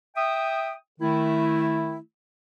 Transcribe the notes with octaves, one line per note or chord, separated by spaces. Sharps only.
E5 G5 D#6
D#3 A3 E4